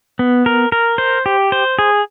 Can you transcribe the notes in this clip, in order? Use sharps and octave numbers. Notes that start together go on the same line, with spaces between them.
B3
A#4
A#4
C5
G4
C5
G#4